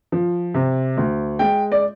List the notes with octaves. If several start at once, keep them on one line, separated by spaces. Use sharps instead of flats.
F3
C3
D2
G#3 G5
D5